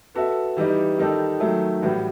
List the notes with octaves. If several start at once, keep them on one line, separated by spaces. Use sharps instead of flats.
B3 F#4 A4 E5
E3 G3 D#4 G4
D#3 G3 D#4 A4
D#3 F#3 A3
A2 E3 G3 B3 F#4